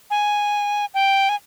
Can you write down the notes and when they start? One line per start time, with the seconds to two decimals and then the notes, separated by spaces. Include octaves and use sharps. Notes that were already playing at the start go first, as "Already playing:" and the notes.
0.10 G#5
0.94 G5
1.29 G#5